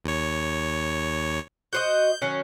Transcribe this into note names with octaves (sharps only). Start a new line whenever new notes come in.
D#2 C#5
F#4 C5 D#5 G6
D#3 F#3 C#4